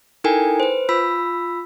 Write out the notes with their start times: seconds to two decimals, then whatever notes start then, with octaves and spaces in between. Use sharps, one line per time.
0.24 D#4 E4 A4 A#4 G5 G#5
0.60 B4 C5
0.89 F4 B5 E6 B6